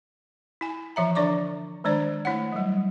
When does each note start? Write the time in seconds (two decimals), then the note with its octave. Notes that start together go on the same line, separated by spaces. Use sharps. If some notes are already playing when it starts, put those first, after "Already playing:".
0.61 E4 G#5
0.96 E3 F3 E5 A#5
1.15 D3 D4 D5 C#6 D6
1.84 D#3 G#3 D4 C5 D5
2.25 A3 E4 C#5 F#5
2.52 F#3 G3